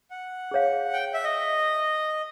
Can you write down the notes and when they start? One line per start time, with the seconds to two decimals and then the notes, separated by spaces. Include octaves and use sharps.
0.10 F#5
0.51 G#4 C#5 F5
0.93 G5
1.14 E5
1.24 D#5